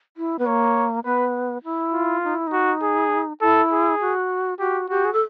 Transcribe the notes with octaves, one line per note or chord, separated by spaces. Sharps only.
E4
B3
A#3 C#5
B3 B4
E4
F4
D#4
E4
D#4
F#4
G#4
E4 A4
G#4
F#4
F#4 G4
F#4 G4
G#4
A4